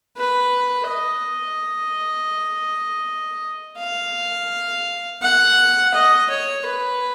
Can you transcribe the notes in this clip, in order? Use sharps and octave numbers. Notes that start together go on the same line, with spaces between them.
B4
D#5
F5
F#5
D#5
C#5
B4